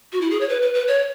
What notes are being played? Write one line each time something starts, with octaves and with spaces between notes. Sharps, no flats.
F#4
E4
G#4
C#5
B4
B4
B4
C#5